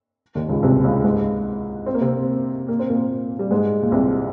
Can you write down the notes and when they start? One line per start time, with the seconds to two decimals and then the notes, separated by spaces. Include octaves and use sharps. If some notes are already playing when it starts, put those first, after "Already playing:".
0.35 D#2 D#3
0.49 C#2 C#3
0.63 C2 C3
0.84 C#2 C#3
1.04 G#2 G#3
1.86 C4
1.94 A#3
2.01 C3 C4
2.68 A#3
2.79 C4
2.89 A#2 A#3
3.39 G3
3.51 G#2 G#3
3.82 A#2
3.92 C2 C3